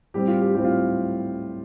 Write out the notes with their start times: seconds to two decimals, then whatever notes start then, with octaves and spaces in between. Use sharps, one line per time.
0.14 A2 G3 C4 G4
0.28 F4
0.41 G4
0.55 A2 G3 C4 G4
0.64 F4